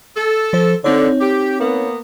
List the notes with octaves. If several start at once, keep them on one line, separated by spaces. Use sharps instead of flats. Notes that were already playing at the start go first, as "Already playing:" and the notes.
A4
F3 C5
D3 C4 D#4 C#5
G4
A#3 B3